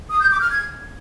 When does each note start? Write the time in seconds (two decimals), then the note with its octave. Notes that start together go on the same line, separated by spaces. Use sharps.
0.10 D#6
0.20 G6
0.30 D6
0.40 F6
0.50 G#6